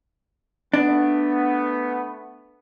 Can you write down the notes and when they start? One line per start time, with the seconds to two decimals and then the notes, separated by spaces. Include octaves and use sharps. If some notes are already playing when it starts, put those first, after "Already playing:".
0.74 A3 B3 D4